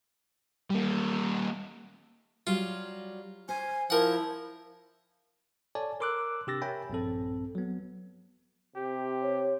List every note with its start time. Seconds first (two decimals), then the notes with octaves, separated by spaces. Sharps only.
0.70 G3 A#3
2.47 F#3 G3 F4
3.49 C5 G#5
3.90 F3 E4 A#4 F#5
5.75 A4 C#5 D5 G#5 A5
6.00 A#4 C6 D6 E6 F#6
6.47 C3 D4 G4 E6 A6 A#6
6.62 A#4 C#5 E5 G5 G#5 B5
6.90 A#1 G2 C4 A4
7.55 F#3 B3
8.76 C3 G4
9.21 C#5